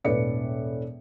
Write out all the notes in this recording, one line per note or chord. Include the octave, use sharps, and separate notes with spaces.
E1 A2 B4 D5 C#7